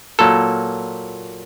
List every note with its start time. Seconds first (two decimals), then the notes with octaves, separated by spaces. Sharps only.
0.19 A#2 F#3 A#3 A4